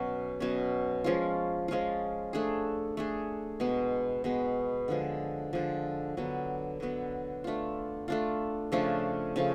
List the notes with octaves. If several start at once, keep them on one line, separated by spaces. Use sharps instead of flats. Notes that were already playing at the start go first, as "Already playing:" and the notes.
Already playing: B2 F#3 C#4
B2 F#3 C#4
F3 G#3 C#4 F4
F3 G#3 C#4 F4
A3 D4 G#4
A3 D4 G#4
B2 G#3 B3
B2 G#3 B3
D3 F3 G#3
D3 F3 G#3
D3 F#3 B3
D3 F#3 B3
A3 D4 F4
A3 D4 F4
C#3 F3 A3 D4
C#3 F3 A3